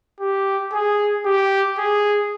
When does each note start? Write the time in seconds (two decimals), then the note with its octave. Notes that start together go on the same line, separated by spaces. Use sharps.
0.20 G4
0.72 G#4
1.25 G4
1.78 G#4